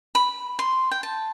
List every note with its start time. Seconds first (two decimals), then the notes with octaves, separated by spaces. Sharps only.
0.15 B5
0.59 C6
0.91 G5
1.03 A5